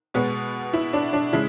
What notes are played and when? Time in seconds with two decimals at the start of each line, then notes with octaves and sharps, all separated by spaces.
0.14 B2 G#3 B3
0.73 E4
0.93 D4
1.13 D4
1.33 C#3 G#3 E4